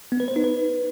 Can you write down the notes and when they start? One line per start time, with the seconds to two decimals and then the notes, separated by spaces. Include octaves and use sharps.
0.12 B3
0.20 B4
0.28 C5
0.36 D#4
0.44 B4